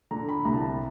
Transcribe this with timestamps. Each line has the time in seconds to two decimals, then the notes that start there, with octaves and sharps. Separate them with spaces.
0.11 D3 A#5
0.29 B5
0.45 C2 A#5
0.53 A5
0.61 A#5